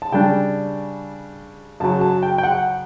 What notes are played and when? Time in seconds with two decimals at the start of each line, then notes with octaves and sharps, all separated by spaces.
0.02 A5
0.12 C#3 G3 D4 G5
1.80 F#2 C#3 F#3 A5
2.01 A5
2.23 G5
2.38 G5
2.43 F#5